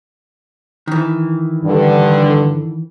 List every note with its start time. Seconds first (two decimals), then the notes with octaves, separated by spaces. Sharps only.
0.87 D#3 E3
1.65 G2 D3